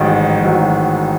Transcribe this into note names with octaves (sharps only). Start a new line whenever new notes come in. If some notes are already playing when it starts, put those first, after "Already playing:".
Already playing: A1 G#2 D#3 F#3
A1 G#2 D#3 F#3